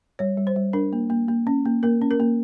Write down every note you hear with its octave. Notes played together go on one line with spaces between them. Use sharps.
G3 C#5
G3
C5
G3
D4 A#4
A#3
A#3
A#3
C#4
A#3
A#3 A#4
C#4
A#4
A#3